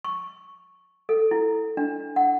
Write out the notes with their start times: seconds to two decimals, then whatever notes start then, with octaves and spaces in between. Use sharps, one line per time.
0.04 C#6
1.09 A4
1.31 E4
1.77 D4
2.16 F#5